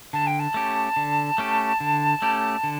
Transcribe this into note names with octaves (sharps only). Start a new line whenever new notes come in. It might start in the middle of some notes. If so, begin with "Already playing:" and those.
D3 A5
G5
A5
A3 C#4 G4
D3
A3 C#4 G4
D3
A3 C#4 G4
D3